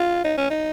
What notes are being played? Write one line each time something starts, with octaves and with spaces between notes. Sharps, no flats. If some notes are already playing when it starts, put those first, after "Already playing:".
Already playing: F4
D#4
C#4
D#4